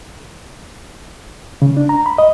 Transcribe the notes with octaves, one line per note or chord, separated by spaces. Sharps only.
C#3
D4
A#5
B5
D#5